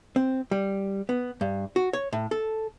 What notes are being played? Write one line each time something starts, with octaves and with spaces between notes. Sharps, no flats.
C4
G3
B3
G2
F#4
C#5
A2
A4